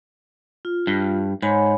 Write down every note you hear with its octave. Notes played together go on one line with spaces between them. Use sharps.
F4
G2
G#2 C#5 G#5 B5